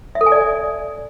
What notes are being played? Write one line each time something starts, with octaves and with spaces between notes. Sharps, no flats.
E5
A4
G#5
D5